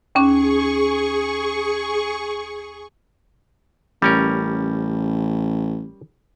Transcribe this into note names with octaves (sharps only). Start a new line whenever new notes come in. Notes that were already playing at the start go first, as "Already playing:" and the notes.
D#2 C#4 G#4 C#6 D6
A1 G3 C#4 A#4